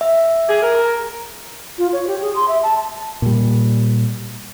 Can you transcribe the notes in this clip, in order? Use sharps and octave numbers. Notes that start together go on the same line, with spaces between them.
E5
G4 G#4
A#4
A#5
F4
C#5
G4
G#4
C6
E5
A5
A#2 G3